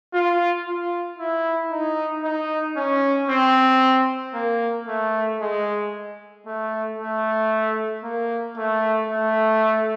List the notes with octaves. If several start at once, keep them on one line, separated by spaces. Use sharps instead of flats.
F4
F4
E4
D#4
D#4
C#4
C4
A#3
A3
G#3
A3
A3
A#3
A3
A3